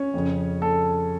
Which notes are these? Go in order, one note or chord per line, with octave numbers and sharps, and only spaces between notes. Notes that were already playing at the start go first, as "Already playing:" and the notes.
Already playing: C#4 C#5
F2 C#3
A4